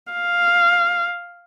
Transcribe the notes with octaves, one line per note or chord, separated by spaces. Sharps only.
F5